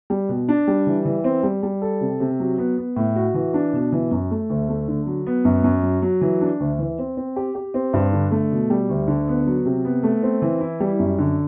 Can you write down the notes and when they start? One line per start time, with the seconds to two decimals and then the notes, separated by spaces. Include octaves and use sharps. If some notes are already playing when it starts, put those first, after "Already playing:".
0.10 G3
0.29 B2
0.49 D4
0.68 G3
0.87 E3
1.05 E3
1.24 C4
1.43 G3
1.63 G3
1.82 A4
2.01 C3
2.20 C3
2.40 F#3
2.58 B3
2.77 B3
2.96 A2
3.16 F#4
3.34 E3
3.54 D4
3.73 B2
3.93 E3
4.11 F#2
4.31 A3
4.50 D2
4.69 A3
4.88 D3
5.07 F#3
5.27 B3
5.45 F#2
5.64 F#2
5.83 F#3
6.02 F#3
6.21 E3
6.41 D4
6.60 D2
6.79 E3
6.99 C4
7.17 C4
7.36 G4
7.55 G4
7.74 C4
7.93 G2
8.13 D3
8.31 A3
8.51 B2
8.70 G3
8.89 D2
9.08 D3
9.28 B3
9.47 F#3
9.65 C3
9.85 B3
10.03 A3
10.23 C4
10.42 E3
10.61 E4
10.80 G3
10.99 F#2
11.18 D3